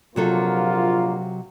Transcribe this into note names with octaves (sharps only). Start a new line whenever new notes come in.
A#1 C3 F#3 A#3 F4 A4